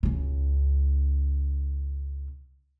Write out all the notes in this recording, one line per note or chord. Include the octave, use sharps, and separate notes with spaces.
C#2 C#3